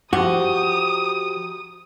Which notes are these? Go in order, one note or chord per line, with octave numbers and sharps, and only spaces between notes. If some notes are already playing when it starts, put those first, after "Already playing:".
F3 F#4 G4 D#6